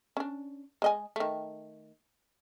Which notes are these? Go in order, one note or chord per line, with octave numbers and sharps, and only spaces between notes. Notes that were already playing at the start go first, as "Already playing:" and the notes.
C#4 D4
G#3 D#5 G#5
D#3 A3